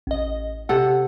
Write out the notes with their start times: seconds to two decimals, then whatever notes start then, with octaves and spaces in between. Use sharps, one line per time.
0.07 A1 D#5
0.69 C3 A4 F#5